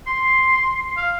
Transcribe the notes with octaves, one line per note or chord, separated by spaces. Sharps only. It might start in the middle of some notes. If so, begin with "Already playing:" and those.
C6
F5